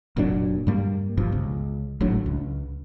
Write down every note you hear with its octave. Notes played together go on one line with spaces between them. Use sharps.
F1 A#2 F#3 D4
G2 G3 A#3
G1 G2 B2 F3
C#2
G#1 A2 F#3 D4
C#2